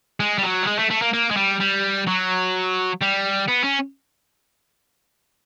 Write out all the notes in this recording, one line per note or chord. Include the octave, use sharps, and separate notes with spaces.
G#3
G3
F#3
G3
G#3
A3
A3
A#3
A#3
G#3
G3
G3
F#3
G3
B3
C#4